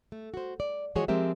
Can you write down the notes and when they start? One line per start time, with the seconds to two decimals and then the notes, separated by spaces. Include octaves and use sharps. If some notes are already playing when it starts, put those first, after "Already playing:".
0.12 A3
0.34 F#4 C5
0.60 D5
0.95 E3 F3 G#3 F#4 G#4 C#5
1.08 F3 G#3 C4 G4 A#4 E5